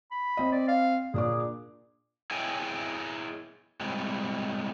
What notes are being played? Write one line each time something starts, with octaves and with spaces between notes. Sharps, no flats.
B5
C4 D#5
D5
F5
A#2 D4 G#4 D6
E4 G#4 C#5 D#5 G5 G#5
A2 C3 G3 G#3